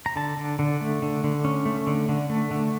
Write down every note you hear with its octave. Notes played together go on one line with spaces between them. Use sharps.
A#5
D3 A5
D3
D3
A3
D3
D3
C#4
A3
D3
D3
A3
D3